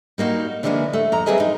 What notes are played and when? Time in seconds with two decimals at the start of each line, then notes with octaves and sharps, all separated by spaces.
0.18 G3 A#3 D#4 F#4
0.63 D3 E3 F3 G#3 A#3 B3
0.93 A3
1.12 F2 A#5
1.26 E3 G3 C4 G#4 B4 D#5
1.38 G#3 D#4